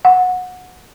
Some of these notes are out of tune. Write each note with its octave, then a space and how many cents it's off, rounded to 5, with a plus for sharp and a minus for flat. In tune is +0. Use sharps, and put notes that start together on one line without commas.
F#5 -20